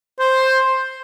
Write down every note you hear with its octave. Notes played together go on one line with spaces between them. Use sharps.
C5